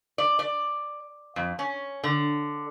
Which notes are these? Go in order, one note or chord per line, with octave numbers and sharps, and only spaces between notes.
D5
D5
F2
C#4
D3